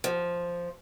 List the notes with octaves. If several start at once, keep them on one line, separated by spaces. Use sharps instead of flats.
F3